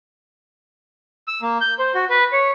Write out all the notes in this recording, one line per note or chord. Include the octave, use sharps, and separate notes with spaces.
E6
A#3
G6
C5
F#4
B4
C#5